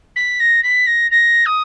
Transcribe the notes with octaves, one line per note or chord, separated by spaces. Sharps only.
B6
A#6
B6
A#6
A#6
D#6